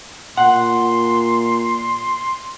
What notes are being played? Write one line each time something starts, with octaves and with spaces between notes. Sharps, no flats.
A#2 F#5 C6